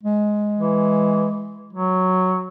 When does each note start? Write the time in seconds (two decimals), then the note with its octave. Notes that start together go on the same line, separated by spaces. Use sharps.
0.03 G#3
0.59 E3
1.73 F#3